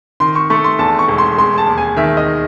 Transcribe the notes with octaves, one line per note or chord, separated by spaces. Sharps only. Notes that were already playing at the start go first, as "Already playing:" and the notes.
D#3 C6
C#6
A3 C#6
C6
E2 A5
C#6
E1
C6
G#3 C6
A5
D#2
G#5
D#3 E5
D#5